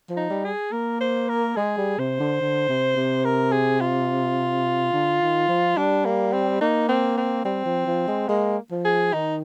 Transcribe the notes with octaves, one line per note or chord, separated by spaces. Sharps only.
F3
D#4
G3
G#4
A#3 A#4
C5
A#4
G#3 G#4
G3
C3 C5
D3
D3
C3
C3
A#4
G#4
F4
D3
D#3
F3
G3 D4
A#3
C4
A#3 D#4
C4
C4
G3 C4
F3
F3
G#3
G#3 A#3
F3
G#4
D#3 D#4